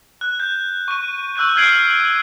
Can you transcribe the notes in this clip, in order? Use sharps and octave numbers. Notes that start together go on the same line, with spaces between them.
F#6
G6
C#6 D#7
C#6 E6 F#6 G6 D#7
F6 G6 G#6 C7 D7 F#7